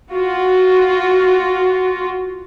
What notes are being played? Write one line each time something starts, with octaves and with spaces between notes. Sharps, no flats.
F4 F#4